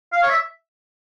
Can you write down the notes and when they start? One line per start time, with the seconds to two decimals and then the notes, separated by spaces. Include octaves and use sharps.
0.12 F5
0.23 C#5
0.30 E5